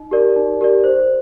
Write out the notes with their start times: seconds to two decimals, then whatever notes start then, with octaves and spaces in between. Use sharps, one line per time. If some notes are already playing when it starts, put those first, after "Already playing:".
Already playing: D#4
0.11 G4 A#4 D5
0.36 D#4
0.61 G4 A#4 D5
0.84 C5